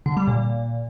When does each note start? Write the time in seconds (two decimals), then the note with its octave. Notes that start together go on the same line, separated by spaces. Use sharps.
0.06 D3
0.17 G3
0.27 A#2